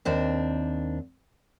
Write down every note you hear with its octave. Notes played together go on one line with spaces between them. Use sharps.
D#2 C4 D4